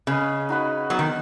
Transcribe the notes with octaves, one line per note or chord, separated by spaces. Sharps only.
C#3 C#4 B4 D#5
D#4 F#4 B4 D#5
F#3 B3 D#4 B4 D#5
D#3